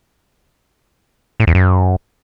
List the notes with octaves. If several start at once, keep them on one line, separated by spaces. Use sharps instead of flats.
A2
E2
F#2